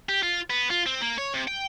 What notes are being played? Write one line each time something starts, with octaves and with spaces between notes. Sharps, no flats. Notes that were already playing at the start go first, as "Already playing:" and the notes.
G4
F4
B3
F4
C4
A#3
C#5
C3
G5